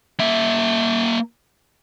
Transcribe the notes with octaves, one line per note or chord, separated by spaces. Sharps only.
A#3 E5